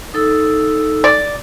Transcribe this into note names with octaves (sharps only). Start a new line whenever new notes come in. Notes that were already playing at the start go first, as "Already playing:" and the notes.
D#4 A4 E6
D5